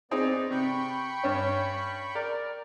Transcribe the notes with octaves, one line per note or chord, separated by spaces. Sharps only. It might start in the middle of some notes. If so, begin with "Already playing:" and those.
B3 C4 D#4 G#4 D5
C3 G5 B5 C#6
G2 C#4
A#4 D5